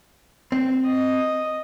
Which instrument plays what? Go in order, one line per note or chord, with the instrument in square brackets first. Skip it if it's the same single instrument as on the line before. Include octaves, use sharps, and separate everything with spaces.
[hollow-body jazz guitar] C4
[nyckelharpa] D#5